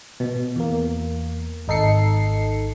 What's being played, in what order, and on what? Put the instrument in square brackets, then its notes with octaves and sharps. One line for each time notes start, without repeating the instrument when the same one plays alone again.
[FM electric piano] B2
E2 A#3
G#1 D#4 A4 C7 C#7